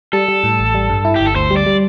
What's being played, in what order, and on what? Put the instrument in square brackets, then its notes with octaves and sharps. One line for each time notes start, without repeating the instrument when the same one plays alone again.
[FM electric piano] G3 [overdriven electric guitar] A4
[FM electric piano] G3
A2
A1
G3
G2
E4
[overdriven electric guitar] G4
[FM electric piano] G1
[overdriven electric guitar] A4
[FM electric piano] D2 [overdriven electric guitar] C5
[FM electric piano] G3
[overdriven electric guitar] D5
[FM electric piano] G3